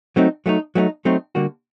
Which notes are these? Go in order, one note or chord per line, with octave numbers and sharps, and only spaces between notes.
F#3 A3 C4 D#4
F#3 A3 C4 D#4
F#3 A3 C4 D#4
F#3 A3 C4 D#4
D3 G3 A#3 F#4